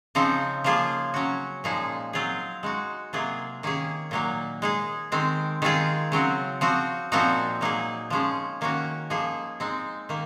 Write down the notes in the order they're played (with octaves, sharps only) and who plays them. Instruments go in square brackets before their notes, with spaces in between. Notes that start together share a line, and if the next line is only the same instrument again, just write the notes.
[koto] C#3 F3 C4 D#4
F3 A#3 F4 G#4
F#3 C#4 F#4
A#2 F3 G#3 D#4 G#4
F#3 C4 F4 G#4
G#3 D#4 F#4
C3 F#3 A#3 F4 G#4
D#3 A#3 C#4 G#4
A#2 F#3 A#3 D#4
G#3 D#4 G#4
D#3 G#3 C4
D#3 G#3 C4 F4 G#4
C#3 F#3 C4 F#4
F3 C4 F#4
A#2 F3 C4 D#4 F#4
F#3 A#3 D#4 G#4
F3 G#3 C#4 G#4
D#3 A#3 C#4 F#4
F3 A#3 D#4 G#4
G#3 C4 D#4
D#3 A#3